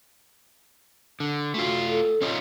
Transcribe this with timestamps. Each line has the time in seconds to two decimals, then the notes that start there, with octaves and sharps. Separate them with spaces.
1.20 D3
1.54 A3 F4 F#4
1.89 A4
2.22 C#4 D#4 F4